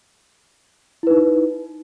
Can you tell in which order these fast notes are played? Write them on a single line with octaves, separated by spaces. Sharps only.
E4 B4 D#4